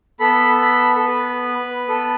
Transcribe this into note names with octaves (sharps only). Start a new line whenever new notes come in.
B3 A4 B5
B5
A4
B4
B3 A4